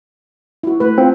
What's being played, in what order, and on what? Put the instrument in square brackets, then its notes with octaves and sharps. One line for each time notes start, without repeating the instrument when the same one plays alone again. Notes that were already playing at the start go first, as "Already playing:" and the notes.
[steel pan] E4 F#4
A3 B4
[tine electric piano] C4 [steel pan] F4